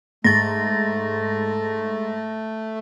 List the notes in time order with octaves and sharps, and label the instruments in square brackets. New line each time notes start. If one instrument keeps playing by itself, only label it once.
[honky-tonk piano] G#2 [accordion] A3 [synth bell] A6 A#6